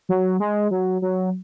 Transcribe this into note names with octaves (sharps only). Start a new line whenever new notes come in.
F#3
G#3
F#3
F#3